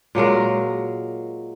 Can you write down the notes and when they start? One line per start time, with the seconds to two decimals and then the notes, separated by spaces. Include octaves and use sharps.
0.15 A#2 F#3 G#3 A#4